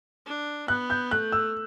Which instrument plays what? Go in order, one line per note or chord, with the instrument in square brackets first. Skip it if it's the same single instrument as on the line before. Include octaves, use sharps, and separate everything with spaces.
[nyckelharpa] D4
[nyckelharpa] B3 [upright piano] F#6
[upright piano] G6
[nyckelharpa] A3 [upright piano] F#6
[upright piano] E6